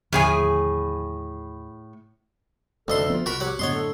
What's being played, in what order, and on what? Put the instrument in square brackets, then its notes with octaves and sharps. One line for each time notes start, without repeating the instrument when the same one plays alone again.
[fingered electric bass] D#2 D3 F3 [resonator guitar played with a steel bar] A2 G#4 G#5
[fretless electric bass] F1 [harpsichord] D2 D#5 C6 [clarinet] A4
[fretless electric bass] F3 B3 C4 [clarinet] F4
[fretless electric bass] C2 [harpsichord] F#4 A#4 B5
[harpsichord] F#3 F#5 [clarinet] G4
[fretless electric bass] F#2 A2 D3 [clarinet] B3 [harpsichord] C#5 D#5 C6
[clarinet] A4